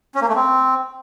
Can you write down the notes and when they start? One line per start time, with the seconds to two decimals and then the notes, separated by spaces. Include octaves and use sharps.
0.15 C#4
0.22 A#3
0.28 A3
0.35 C4